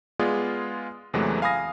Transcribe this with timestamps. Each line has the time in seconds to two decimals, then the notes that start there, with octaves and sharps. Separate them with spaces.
0.19 G#3 B3 F4 G#4 D5
1.14 E2 C3 E3 F#3 G#3 A3
1.42 F5 G#5 B5 D#6 A#6